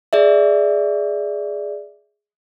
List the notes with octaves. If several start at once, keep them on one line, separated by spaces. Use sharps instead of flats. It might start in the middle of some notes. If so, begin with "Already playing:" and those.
G#4 D5 E5